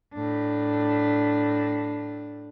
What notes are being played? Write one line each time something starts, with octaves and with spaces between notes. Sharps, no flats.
A2 D4